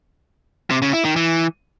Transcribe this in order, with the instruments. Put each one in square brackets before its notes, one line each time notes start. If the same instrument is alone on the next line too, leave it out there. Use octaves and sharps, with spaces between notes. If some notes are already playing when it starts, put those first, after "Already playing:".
[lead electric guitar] C3
C#3
E4
D#3
E3